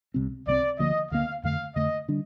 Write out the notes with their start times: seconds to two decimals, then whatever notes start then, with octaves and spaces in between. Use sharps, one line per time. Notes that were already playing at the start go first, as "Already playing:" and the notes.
0.14 C2 C3 G3 C4
0.47 C2 C3 G3 C4 D5
0.78 D2 D3 F3 A#3 D#5
1.11 D2 D3 F3 A#3 F5
1.43 F2 D3 A3 F5
1.75 F2 D3 A3 D#5
2.08 D3 G3 D4